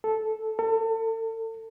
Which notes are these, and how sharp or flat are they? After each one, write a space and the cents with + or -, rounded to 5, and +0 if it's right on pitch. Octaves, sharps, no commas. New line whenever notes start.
A4 -10
A4 +35